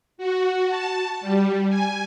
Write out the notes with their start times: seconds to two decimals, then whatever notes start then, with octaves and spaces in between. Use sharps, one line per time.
0.18 F#4
0.69 A5
1.21 G3
1.69 G#5